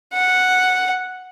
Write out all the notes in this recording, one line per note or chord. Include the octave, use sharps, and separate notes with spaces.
F#5